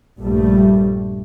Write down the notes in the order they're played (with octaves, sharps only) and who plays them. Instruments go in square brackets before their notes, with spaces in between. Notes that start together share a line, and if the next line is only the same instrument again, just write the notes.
[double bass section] A#1 G2 G3 A3